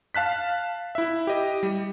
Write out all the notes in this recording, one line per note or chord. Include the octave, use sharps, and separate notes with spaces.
F5 A5 F#6 B6
E4 E5
G4 D#5
G3